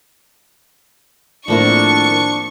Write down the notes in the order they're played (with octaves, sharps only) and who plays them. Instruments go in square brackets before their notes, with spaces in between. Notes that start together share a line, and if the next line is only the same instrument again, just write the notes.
[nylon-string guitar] A2 D#3 E4 [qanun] F3 A#3 C4 [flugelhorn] D4 [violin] C#6